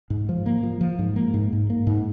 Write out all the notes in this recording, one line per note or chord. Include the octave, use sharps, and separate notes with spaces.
G#2
F3
A#3
F3
F3
G#2
A#3
G#2
G#2
A#3
G#2